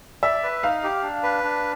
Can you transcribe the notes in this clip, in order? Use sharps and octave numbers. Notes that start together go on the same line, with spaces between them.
D5 E5
B4
D#4 F5
G4
D4
B4
D4